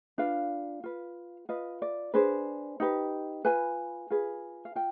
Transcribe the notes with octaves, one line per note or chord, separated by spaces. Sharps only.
D4 F4 B4 F5
F4 B4
F4 B4 D#5
D5
D4 G#4 B4 C5
D#4 G4 B4
F4 B4 G#5
F4 G#4 B4
F5
F4 G5